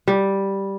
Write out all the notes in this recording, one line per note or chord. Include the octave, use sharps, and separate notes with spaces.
G3